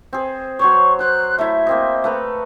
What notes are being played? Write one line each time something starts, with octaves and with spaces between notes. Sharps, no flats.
C4 G#4
F#3 C5 C#5 C#6
C5 A#5 F#6
A3 E4 E5
A#3 C4 D#5
A3 B4 A#5